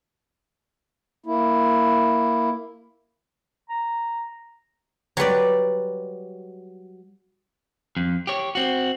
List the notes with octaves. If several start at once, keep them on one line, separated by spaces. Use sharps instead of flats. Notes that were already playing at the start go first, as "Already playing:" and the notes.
A#3 E4
A#5
F#3 G3 B4 D5
F2
G4 C#5
C4 F#4